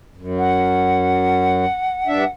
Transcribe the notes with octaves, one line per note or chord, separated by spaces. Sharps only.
F#2
F#5
G2 D4 E5